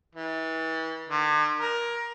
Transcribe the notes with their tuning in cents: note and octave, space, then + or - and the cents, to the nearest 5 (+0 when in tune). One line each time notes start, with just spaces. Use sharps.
E3 -35
D3 +45
A#4 +20